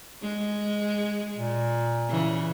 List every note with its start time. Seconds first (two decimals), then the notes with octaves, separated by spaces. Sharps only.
0.22 G#3
1.36 A#2
2.09 C#3 E3